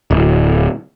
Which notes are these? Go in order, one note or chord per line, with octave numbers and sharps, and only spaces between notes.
D1